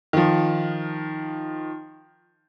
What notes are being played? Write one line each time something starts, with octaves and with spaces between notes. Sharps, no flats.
D#3 F3